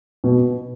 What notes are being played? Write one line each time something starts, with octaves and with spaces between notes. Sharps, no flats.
B2